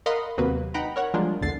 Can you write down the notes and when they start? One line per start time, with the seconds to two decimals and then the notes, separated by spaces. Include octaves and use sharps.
0.06 A#4 D#5 F5 F#5 B5 C6
0.37 D#2 C3 F#3 A#3 F#4 B4
0.74 D#4 F#5 G5 A#5 B5
0.96 A#4 C#5 F#5
1.14 F3 G3 G#3 A#3 D4 F4
1.41 B1 E2 D3 A6 C7